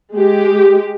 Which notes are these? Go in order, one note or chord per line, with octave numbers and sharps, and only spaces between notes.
G#3 G4